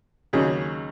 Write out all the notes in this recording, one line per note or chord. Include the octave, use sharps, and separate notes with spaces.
D#2 C#3 F#3 C#4 G#4